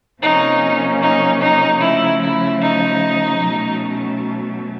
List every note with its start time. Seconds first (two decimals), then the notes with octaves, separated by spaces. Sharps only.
0.22 C3 F3 A#3 C#4 D#4
1.02 D#4
1.41 D#4
1.80 C#3 F3 A3 E4
2.20 E4
2.61 D#4
3.40 B2 F#3 A3 C#4